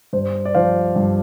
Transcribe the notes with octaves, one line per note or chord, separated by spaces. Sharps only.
G2 C5
D5
F3 C5 F5
G2